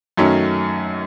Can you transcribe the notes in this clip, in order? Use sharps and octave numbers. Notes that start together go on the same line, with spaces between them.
F#2 D#3 F#3 A3 C#4